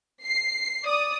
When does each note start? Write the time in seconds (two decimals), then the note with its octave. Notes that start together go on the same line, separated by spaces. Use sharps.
0.24 C7
0.85 D5 D#6